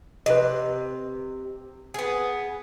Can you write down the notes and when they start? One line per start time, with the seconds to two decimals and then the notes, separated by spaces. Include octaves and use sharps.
0.26 C3 B4 D#5
1.94 B3 G#4